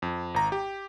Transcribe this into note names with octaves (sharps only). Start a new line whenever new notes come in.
F2
G#1 A#5
G4